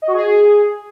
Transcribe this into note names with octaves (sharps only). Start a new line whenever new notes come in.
D#5
F#4
G#4